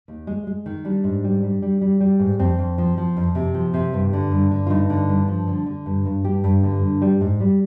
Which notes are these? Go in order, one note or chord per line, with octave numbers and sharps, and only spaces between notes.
D#2
G#3
G#3
D#3
G3 D4
G#2
G3
G3
G3
G3
G3
G#2
F2 C4
F2
F3
F3
F2
C3
F3
C3
G2
D3
G2
D3
F4
G2 D#4
D3
G2
F3
D3
D3
G2
G2
G2 G4
G2
D3
G2
G3
G#2
G3